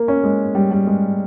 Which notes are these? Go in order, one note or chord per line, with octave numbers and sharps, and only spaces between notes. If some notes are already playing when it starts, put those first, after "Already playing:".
Already playing: A#3
C#4
G#3
G3
G3
G#3